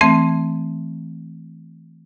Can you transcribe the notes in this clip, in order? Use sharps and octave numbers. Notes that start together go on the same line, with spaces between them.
E3 A3 C4